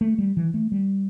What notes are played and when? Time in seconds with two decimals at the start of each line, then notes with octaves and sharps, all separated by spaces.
0.01 A3
0.18 G3
0.37 E3
0.54 A3
0.72 G3